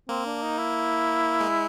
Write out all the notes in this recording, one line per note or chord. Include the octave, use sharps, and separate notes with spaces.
A#3 C4
D4
D#4
E4
G#3